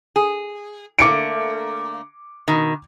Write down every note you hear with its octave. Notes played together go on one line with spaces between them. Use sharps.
G#4
D3 A3 A#3 D6 C#7 D7
B2 D#3